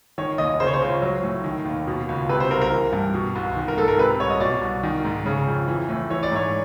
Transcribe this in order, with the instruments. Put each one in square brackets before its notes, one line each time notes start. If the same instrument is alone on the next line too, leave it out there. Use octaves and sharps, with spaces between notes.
[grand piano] D#3 C#5
D#2 D#5
C#3 C5
C#5
C5
C#2
F#3
A2
D#3
D#2
B2
C#2
C3 B4
C5
C2 A#4
A#4
E3
G2
B2
C2
D#3
A#4
G#2 A4
A#4
C3 B4
C2 C#5
D#5
B2 D5
C2
D#3
G#2
C#3
F2
E3
A2
E3 C#5
D5
G#2 C#5